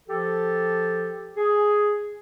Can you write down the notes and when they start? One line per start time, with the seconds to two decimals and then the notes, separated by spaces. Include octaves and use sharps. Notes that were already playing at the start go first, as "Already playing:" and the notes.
0.08 F3 G4 A4
1.36 G#4